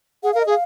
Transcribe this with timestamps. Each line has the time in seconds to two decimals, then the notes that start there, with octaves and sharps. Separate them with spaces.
0.23 G#4 F#5
0.32 A#4 F5
0.41 D#5
0.46 G#4
0.50 F5